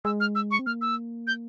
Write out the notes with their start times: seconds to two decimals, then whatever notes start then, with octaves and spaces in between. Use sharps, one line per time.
0.05 G#3 E6
0.20 F6
0.35 E6
0.51 C#6
0.59 C4
0.66 A#3 F6
0.81 E6
1.27 G6